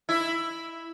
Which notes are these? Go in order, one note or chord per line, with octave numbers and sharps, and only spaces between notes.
E4